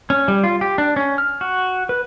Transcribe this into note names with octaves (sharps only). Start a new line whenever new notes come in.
C#4
G3
F4
G4
D4
C#4
F6
F#4
B4